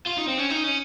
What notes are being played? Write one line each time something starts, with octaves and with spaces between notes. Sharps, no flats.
F4
D#4
C4
C#4
D#4
C#4